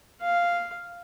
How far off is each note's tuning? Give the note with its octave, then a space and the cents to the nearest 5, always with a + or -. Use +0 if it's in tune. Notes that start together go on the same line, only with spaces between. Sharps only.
F5 -5